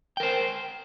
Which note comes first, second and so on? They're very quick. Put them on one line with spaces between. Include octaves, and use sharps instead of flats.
G5 A#4 C5